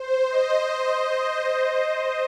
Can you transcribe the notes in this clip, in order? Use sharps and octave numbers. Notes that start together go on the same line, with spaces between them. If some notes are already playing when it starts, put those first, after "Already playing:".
Already playing: C5
D#5
D#5